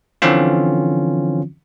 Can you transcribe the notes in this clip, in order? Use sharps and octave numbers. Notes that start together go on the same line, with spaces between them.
D3 E3 F3 C4 C#4 F4